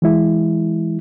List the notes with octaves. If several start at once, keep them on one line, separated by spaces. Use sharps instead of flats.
E3 G#3 E4